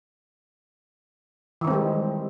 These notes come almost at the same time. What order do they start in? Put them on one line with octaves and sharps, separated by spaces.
E3 D#3 C4 G#3 G3